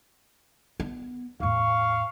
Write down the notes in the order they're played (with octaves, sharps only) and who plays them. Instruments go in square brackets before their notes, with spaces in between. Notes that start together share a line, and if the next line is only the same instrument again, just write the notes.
[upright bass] B3
[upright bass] E2 A2 [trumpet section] F5 C#6